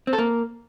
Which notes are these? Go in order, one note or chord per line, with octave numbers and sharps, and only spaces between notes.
C4
A4
A#3